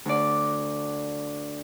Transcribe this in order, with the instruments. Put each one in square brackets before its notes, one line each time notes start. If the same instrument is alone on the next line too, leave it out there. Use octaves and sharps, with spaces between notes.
[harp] D2 D5